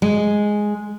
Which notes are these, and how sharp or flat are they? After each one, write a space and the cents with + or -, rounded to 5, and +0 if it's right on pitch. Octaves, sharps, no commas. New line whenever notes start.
G#3 +0